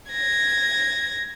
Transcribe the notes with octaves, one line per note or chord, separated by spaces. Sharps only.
G#6 A#6